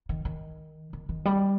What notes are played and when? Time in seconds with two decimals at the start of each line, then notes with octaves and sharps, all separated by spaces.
0.09 D#3
0.25 D#3
0.93 D#3
1.09 D#3
1.25 G3